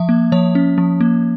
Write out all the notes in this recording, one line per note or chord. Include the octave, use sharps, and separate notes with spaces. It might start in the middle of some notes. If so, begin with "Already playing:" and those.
Already playing: F3 E5
A#3
F3 C#5
C#4
F3
A#3